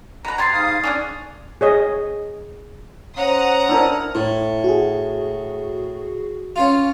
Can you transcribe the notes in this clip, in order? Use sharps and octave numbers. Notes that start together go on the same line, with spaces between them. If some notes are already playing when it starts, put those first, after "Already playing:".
B2 B4 A#5
C3 C4 C6 G#6 A6 C7
G#2 F5 D#6
C#4 D4 G#4 D5
G#4 C#5 D#5
C#4 C5 F#5 A#5 D#6
D4 E4 A#4
A2 E4
F#4 G#4
C#4 F4